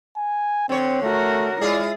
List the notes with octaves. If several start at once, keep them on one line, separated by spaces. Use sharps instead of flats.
G#5
D3 C4 C#5
A3 F#4 A#4
G#3 E4 F4 G#4 D5